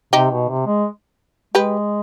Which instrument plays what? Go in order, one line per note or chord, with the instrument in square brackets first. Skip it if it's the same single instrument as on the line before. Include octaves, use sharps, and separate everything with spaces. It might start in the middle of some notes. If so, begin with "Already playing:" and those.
[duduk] C3 [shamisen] D#4 G4
[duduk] B2
C3
G#3
[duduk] G#3 [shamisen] G4 B4